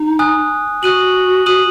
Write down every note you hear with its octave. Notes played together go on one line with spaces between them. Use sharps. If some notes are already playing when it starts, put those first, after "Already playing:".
Already playing: D#4
G#5 D#6 F#6
F#4 D#6 F#6 D#7 F#7
D#6 F#6 D#7 F#7